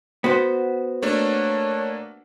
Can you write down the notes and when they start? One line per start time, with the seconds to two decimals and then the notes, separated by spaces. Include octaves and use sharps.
0.24 B3 F#4 C5
1.02 A3 A#3 D4 C#5